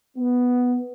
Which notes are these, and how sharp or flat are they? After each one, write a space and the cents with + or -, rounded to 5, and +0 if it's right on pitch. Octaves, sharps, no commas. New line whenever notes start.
B3 +0